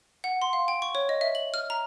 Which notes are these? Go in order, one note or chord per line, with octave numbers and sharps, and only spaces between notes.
F#5
C6
F5
G5
C#6
C#5
D#5
E5
F#7
F6
A#5